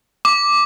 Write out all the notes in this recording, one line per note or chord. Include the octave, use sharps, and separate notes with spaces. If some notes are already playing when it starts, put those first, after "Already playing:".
D6